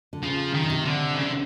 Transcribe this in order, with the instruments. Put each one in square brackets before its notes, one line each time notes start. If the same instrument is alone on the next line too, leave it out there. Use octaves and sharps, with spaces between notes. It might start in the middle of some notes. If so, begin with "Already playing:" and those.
[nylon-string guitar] D3
[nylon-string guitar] C#3 [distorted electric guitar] F3
[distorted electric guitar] D#3
[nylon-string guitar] C#3
C3
[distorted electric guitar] D3
C#3
D3